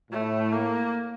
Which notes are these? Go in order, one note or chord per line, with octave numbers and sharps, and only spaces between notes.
A2 A3
A#3